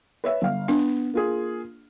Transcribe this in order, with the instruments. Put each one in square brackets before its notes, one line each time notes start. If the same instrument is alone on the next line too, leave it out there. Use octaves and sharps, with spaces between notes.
[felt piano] B4 C#5 E5
G1 F5
[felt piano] B3 [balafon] D4
[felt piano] A#3 F4 G#4